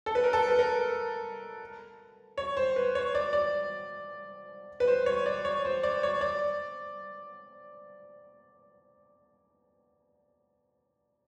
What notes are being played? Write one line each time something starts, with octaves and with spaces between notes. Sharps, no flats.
A4
B4
A#4
A4
B4
A#4
C#5
C5
B4
C#5
D5
D5
B4
C5
C#5
D5
C#5
C5
D5
C#5
D5